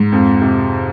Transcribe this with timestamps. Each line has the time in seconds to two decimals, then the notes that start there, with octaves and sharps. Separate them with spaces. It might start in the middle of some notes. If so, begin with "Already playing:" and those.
Already playing: G#2
0.12 F2
0.41 C3